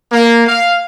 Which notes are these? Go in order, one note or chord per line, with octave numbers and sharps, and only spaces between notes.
A#3
F5